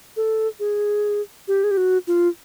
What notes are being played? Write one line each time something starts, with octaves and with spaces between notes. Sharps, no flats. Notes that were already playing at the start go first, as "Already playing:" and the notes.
A4
G#4
G4
G#4
G4
F#4
F4